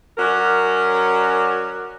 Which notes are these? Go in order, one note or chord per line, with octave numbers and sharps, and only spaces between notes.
F#3 C#4 A#4 D5